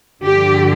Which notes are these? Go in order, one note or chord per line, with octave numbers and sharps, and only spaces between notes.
G2 D3 F3 G4